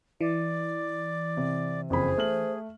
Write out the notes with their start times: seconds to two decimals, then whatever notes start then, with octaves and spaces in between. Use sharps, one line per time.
0.21 E3 D5
1.37 C3
1.90 F#1 F2 G#4 C5 B5
2.18 A3 F6 F#7